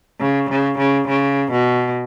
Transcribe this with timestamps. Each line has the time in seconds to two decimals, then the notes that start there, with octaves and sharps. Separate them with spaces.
0.20 C#3
0.50 C#3
0.78 C#3
1.08 C#3
1.52 B2